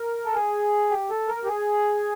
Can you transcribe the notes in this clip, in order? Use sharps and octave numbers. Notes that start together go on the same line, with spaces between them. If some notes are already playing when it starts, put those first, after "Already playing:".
Already playing: A#4
A4
G#4
G4
A4
A#4
G4
G#4